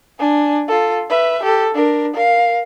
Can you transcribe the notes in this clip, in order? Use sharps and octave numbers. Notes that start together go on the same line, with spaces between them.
D4 G#5
F4 A4
B4 E5
G4 A4
D4 A#4
A#4 F5